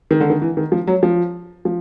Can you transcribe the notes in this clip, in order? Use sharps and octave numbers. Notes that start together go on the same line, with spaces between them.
D#3
D3
D#3
E3
D#3
F3
F#3
F3
F3